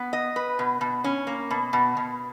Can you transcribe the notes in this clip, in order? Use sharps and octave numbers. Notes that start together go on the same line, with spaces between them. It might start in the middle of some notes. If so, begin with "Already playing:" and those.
Already playing: B3
D#5
B4
B2
B2
C#4
A#3
B2
B2
B2